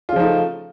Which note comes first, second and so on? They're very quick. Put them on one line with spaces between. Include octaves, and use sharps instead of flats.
F4 C#3 F3 D#4 A3